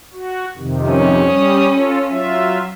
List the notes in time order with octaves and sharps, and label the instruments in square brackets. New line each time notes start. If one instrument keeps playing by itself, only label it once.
[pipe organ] F#4
F2 C3 D#3
[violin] C#4
[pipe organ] G3 D#6
F4 A4
F#3 F4 E5